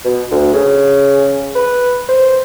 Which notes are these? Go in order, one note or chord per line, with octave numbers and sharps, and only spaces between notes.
B2
D2
C#3
B4
C5